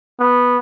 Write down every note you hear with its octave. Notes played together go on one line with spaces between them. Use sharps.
B3